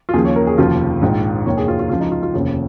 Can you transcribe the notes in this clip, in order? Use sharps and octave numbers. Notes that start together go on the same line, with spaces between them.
F4
D#2 C#3 F3 G#4
C#5
A#4
G#4
F1 D#2 C#3 F3 F4
A#1 G#2 D#3
F1 D#2 D#3 C#5
G#4
F4
F4
C#2 C#3 F3 F4
D#4
F4
F4
F1 D#2 C#3 C#5